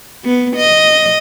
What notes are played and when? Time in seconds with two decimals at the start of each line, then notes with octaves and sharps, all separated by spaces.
0.25 B3
0.56 D#5